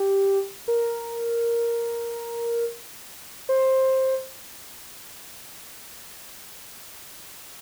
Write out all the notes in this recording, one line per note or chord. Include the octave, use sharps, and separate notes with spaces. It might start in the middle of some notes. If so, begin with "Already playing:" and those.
Already playing: G4
A#4
C5